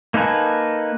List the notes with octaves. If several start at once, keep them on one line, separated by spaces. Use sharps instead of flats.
A#3 D#4 A4 B4 G#5